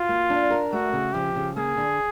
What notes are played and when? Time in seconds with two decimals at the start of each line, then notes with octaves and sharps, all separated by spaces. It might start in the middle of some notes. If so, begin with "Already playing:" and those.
Already playing: F4 F#4
0.09 A#3
0.30 D4
0.50 A#4
0.72 A3 F#4
0.93 C#3
1.14 F3 G4
1.36 C#3
1.56 A#3 G#4
1.77 D3